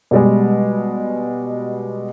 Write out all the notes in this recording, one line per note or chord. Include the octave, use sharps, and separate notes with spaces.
B2 G3 G#3